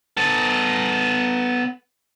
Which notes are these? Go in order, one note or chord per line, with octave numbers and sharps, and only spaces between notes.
B3 A4